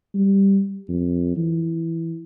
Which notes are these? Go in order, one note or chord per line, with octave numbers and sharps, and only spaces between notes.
G3
F2
E3